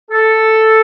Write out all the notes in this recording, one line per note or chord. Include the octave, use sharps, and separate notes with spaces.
A4